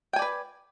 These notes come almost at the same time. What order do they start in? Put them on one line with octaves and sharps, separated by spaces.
G5 G#5 D5 B4